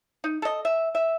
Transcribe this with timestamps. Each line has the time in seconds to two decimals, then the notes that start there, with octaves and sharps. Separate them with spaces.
0.24 D#4
0.42 A4 D#5
0.65 E5
0.95 E5